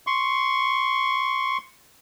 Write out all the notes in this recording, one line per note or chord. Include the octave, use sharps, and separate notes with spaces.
C6 C#6